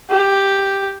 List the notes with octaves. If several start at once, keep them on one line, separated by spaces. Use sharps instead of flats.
G4